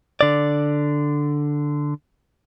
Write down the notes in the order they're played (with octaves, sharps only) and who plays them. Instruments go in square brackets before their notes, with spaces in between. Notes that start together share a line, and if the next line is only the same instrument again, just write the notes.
[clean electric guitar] D3 D5